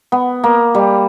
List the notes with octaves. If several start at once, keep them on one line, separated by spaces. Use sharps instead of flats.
B3
A#3
G3